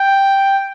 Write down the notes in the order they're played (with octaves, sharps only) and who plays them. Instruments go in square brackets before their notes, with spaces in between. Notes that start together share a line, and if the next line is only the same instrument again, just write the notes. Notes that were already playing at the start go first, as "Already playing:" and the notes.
Already playing: [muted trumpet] G5